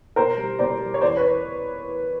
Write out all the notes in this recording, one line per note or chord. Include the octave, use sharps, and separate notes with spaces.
B2 A#4 C5
G3
B2 C5 D5
G3
C#5
E2 C5 D5
B4 C#5